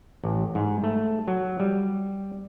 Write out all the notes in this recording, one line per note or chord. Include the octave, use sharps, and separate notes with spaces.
A1
G#2
A3
F#3
G3